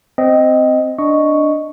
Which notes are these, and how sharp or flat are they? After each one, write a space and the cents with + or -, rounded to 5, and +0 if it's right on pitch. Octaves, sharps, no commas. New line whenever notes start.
C4 -10 D#5 +0
D4 +0 D#5 +0 C#6 +0